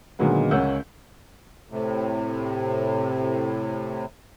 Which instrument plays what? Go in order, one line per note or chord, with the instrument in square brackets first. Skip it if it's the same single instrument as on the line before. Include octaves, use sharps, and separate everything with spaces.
[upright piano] A#2 D3 D#3 F#3 G#3 B3
C#2 C#4 A#4 F#5 E6 G6
[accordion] A2 C3